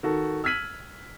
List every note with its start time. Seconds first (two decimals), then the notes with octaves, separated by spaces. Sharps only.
0.03 D#3 F#4 A4
0.44 E6 F6 G#6 B6 D#7 F#7